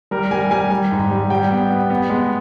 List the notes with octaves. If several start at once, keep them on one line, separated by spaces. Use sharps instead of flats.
G3 A#4
G3 G#5
G3 G#5
G3
G#2
G3
G3 G5
B3
B3
B3
G#3